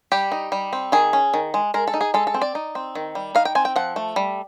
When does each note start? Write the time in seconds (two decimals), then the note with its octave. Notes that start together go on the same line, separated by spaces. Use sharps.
0.12 G3 G4
0.32 D#4
0.52 G3
0.73 C4
0.92 D#3 G#4
1.13 C#4
1.34 D#3
1.54 G#3
1.74 G#3 A#4
1.87 A4
1.94 D#4
2.01 G#4
2.14 G#3 A4
2.27 A4
2.34 C4
2.42 D5
2.55 D#4
2.75 C4
2.95 D#3
3.15 G3
3.35 D#4 F5
3.45 G5
3.55 C4 G#5
3.65 G5
3.76 F3 F#5
3.96 A3
4.16 G3